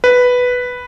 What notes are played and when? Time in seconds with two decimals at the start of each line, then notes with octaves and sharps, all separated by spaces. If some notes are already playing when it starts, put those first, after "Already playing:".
0.04 B4